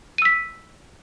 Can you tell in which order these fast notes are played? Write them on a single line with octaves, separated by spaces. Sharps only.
D#7 E6 B6